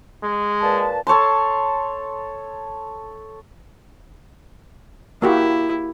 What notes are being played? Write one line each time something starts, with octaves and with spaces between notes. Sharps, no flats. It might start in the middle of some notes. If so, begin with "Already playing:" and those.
G#3
A#2 B4 A5
A4 C#5 A5 C6
A#3 E4 F#4 G4